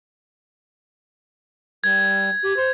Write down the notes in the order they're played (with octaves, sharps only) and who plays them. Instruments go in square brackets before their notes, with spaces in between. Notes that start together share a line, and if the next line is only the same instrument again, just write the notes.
[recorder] G3 [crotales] G#6
[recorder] G4
C5